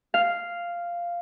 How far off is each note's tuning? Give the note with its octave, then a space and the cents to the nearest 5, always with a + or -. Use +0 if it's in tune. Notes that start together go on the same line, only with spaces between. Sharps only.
F5 -5